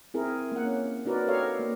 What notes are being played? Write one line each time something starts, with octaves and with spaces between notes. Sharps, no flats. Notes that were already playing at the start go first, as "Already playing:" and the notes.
C4 E4 G#4 A#4
A#3 F#5
C#4
D4 D#4 F#4 A#4 B4 D5
G4 A4 A#4 C#5 D#5 F5
A#3